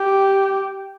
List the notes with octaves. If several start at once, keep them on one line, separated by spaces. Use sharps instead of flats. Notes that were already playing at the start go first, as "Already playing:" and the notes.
Already playing: G4